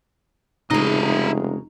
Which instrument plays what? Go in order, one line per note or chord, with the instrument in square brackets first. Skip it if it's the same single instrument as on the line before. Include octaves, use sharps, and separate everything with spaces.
[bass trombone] F1 [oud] C#3 G#3 [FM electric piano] D#4 A#5 [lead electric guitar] E4 D#5